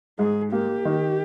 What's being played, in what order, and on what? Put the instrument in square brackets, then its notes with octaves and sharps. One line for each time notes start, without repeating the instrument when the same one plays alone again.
[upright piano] G#2 [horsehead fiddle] G#4
[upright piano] A#3 [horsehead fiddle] G4
[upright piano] D#3